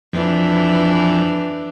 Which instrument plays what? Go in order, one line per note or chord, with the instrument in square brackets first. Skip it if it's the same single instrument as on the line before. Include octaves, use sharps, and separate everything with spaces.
[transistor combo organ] F2 [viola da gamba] E3 D4